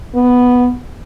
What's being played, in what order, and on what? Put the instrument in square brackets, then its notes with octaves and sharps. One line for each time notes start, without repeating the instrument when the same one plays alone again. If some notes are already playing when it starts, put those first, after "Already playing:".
[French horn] B3